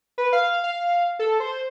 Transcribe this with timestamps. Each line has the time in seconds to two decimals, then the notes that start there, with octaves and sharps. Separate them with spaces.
0.18 B4
0.33 F5
0.64 F5
1.19 A4
1.40 C5